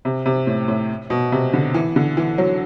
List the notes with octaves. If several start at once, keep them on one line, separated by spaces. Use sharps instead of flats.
C3
C3
A2
A2
B2
C3
D3
E3
D3
E3
F#3